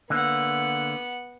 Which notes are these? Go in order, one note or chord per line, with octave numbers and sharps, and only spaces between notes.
D3 A#3 B3 F#5